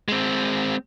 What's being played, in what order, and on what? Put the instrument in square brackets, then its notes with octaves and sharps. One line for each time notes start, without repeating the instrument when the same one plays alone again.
[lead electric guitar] G#3 C4